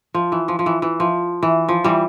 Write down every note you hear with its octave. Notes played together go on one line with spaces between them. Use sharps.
F3
E3
F3
F3
E3
E3
F3
E3
F3
E3 G3